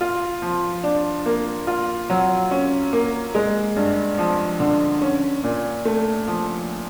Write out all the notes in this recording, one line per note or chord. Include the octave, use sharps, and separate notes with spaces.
F4
F3
D4
A#3
F4
F#3
C#4
A#3
G#3
G2
F3
D3
C#4
A#2
A3
F3